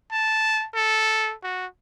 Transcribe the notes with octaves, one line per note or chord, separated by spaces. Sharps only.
A5
A4
F#4